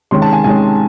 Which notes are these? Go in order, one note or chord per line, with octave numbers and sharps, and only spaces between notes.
C3 D#3 G#3 C#4 C6
A5
G#5
C3 D#3 G#3 C#4 G#5